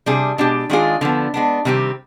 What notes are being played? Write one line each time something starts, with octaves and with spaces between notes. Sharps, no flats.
C3 G3 D4 G#4
B2 G#3 D4 G4
D#3 G#3 D4 F4 G#4
D3 F3 B3
G#3 B3 D4
C3 D#3 G3 C4 G4